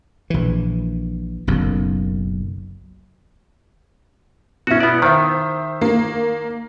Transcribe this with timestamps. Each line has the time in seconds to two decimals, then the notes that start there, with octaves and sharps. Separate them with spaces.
0.30 A#1 E3
1.47 F#1 B1 F#2
4.67 B2 C#4 E4 F#4
4.80 B3 D5
5.02 D#3 C5 E5
5.82 A#3